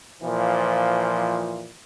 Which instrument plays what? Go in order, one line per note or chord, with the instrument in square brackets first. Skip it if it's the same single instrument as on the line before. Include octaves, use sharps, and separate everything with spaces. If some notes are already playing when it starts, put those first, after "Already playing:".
[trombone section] A#2 E3 F3